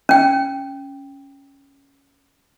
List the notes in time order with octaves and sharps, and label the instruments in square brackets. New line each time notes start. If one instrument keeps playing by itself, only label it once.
[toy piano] C#4 G5